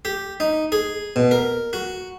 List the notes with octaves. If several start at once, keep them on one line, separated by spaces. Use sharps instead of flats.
G4
D#4
G#4
B2
A#4
F#4